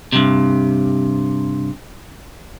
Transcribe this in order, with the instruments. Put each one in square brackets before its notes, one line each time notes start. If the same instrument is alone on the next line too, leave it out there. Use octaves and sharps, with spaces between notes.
[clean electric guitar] G2 C3